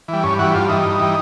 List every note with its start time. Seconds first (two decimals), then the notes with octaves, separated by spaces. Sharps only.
0.08 E3 G3
0.24 G2 C#4
0.39 E3 G3 F#4
0.55 G2 F4
0.69 E3 G3 D#4
0.84 G2
1.00 E3 G3